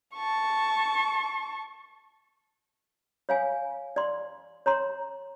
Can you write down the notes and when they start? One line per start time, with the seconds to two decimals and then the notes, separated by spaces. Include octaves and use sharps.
0.16 A5 C#6
3.29 C#5 F5 G#5
3.96 D5 C6
4.66 C#5 A#5 C6